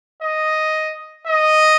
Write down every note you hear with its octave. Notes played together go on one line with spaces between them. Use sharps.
D#5
D#5